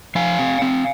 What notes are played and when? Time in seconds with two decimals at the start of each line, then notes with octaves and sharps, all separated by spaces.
0.15 F3 F5 G#5
0.39 C4
0.62 C4